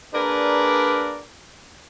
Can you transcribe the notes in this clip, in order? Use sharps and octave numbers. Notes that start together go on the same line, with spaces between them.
A#3 D4 G#4 A#4 B4 D5